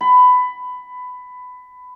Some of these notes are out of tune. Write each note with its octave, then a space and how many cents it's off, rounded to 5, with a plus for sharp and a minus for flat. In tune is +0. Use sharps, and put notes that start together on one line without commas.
B5 +15